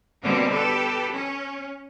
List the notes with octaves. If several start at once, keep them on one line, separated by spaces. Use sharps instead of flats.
B2 D3 G3 A#3 C4 C#4
G4 A4 B4
C#4